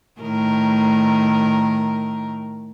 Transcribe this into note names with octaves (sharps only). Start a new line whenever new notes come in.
A2 D#3 A#4